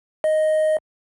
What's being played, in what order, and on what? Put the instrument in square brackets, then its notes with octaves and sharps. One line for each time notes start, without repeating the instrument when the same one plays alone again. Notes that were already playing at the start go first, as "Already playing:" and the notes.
[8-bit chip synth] D#5